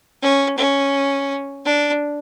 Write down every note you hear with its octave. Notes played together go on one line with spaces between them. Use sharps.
C#4
C#4
D4